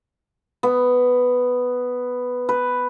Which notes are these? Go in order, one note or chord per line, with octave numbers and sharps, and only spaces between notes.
B3
B4